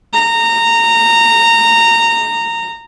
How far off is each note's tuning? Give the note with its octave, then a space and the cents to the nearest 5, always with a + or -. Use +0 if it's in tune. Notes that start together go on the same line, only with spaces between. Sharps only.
A#5 -20